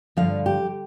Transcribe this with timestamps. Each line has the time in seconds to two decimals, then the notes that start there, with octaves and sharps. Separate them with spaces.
0.17 G2 D3 F3 F5
0.46 G4